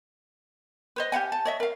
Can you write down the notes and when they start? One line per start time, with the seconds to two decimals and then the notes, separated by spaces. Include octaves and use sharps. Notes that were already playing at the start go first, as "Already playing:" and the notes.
0.96 B4 C5 D#5
1.12 G4 F5 F#5 G#5
1.32 A5
1.45 C#5 D#5 E5
1.60 A#4 F5